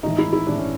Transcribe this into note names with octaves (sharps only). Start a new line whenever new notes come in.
A2 E3 D#4
E4
E4
A2 E3 D4
C#4